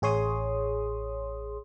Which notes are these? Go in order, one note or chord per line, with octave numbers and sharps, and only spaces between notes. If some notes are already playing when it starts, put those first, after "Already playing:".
A1 G#4 C#5 C6 D#6